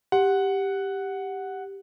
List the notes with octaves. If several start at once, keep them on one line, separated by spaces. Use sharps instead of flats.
G4 F#5